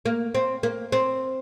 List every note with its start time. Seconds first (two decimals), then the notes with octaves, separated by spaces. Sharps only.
0.05 A#3
0.35 C4
0.63 A#3
0.92 C4